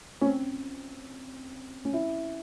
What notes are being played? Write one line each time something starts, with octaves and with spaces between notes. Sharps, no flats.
C#4
C4
C#4
E4